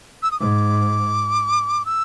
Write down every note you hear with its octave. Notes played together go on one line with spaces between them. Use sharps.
E6
D#6
G#2 D6
E6